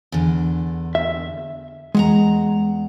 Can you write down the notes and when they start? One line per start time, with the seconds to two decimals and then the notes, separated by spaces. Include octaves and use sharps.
0.12 E2 D3
0.95 E5
1.95 E2 G#3 F#5 A#5